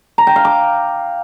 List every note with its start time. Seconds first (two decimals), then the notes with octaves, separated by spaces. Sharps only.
0.18 A#5
0.27 G5
0.36 F5
0.45 D6